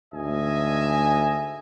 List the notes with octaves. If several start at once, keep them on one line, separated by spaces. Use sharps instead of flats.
D2 G#2 D#5 E5 G#5